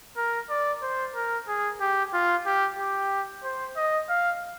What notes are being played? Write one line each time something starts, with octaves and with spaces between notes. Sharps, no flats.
A#4
D5
C5
A#4
G#4
G4
F4
G4
G4
C5
D#5
F5